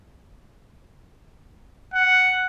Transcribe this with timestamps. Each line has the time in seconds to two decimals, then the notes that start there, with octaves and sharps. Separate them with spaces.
1.94 F#5